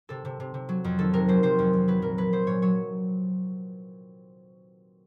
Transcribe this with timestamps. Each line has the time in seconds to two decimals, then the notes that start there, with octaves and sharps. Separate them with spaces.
0.09 C3 A4
0.25 C3
0.40 C3
0.54 C3
0.69 F#3
0.84 F2
0.99 D#3 A4
1.13 C3 A#4
1.28 F#3 C5
1.43 C3 C5
1.59 F2
1.73 F2
1.88 F#3 B4
2.02 A#2 A#4
2.18 F#3 B4
2.33 F#3 C5
2.47 A#2 C#5
2.62 F#3 C#5